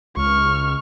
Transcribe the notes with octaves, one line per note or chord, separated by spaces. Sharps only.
C#2 C#6 F6